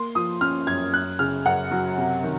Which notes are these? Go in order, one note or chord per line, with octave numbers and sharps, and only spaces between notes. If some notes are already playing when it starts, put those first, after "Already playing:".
Already playing: A#3 C6
F3 D#6
C#4 F6
F#2 G#6
F#2 F#6
C#3 F6
F#2 F#5
F#3
C3
D#3